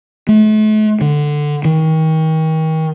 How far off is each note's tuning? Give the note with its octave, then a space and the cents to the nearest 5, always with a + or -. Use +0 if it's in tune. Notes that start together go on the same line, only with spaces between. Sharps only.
A3 -40
D3 +10
D#3 +35